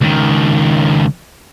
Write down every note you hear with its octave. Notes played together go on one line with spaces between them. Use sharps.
C#2 D#3